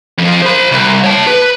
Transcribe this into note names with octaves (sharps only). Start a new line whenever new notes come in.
F2 F3
C5 B5
C2
C#5 A5
B4